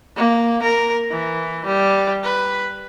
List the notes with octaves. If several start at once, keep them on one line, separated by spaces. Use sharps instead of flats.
A#3
A#4
E3
G3
B4